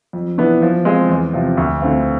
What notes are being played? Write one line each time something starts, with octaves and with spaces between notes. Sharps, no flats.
F2
E3 B3 D4
F3
G#3 C4 F4 G#4
E2
C3 F3
D2
D3 A3 C4 F4